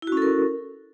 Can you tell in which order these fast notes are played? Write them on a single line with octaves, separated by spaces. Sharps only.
E4 F#4 C#4 A4 A#4